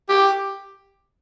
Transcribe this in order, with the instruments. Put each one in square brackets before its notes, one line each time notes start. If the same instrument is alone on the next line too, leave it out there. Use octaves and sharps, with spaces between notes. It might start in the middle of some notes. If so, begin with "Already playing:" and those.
[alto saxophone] G4